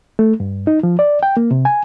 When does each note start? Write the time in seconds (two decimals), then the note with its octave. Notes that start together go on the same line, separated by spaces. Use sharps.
0.19 A3
0.40 G2
0.67 D#4
0.83 F3
0.99 D5
1.23 G5
1.37 A#3
1.51 C3
1.65 G#5